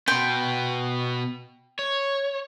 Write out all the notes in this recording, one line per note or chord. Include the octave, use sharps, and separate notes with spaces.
B2 B3 G5 C6
C#5